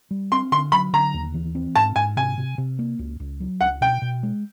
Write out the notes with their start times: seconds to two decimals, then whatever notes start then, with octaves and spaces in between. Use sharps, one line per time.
0.11 G3
0.32 C4 C6
0.52 D3 C6
0.72 F#3 B5
0.93 D3 A#5
1.14 D#2
1.34 E3
1.55 C4
1.76 G#2 A5
1.96 G#2 G#5
2.17 C3 G#5
2.38 C3
2.58 C3
2.79 A#3
2.99 C#2
3.20 C#2
3.40 F#3
3.61 C#2 F#5
3.81 B2 G5
4.02 B2
4.23 G#3